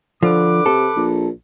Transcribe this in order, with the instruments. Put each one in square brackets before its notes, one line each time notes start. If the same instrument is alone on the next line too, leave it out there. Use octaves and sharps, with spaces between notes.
[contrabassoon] D3 [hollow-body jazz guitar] F3 [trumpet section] B4 D6
[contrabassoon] C3 [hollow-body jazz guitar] A4
[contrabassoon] A#1